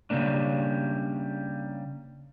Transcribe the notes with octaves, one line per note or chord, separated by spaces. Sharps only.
C#3 G3 A3 A#3 D4